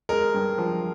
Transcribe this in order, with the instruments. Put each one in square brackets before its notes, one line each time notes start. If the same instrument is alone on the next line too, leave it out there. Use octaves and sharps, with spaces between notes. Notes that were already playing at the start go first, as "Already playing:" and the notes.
[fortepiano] G#3 [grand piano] A#4
[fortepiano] G2
F3